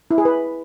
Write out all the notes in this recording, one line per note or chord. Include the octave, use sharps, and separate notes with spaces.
E4
G#4
B4